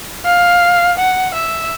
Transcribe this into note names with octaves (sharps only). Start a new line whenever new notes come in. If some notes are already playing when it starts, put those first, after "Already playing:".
F5
F#5
E5